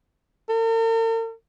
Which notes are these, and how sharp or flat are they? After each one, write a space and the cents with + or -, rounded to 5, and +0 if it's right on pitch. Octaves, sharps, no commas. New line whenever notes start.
A#4 -45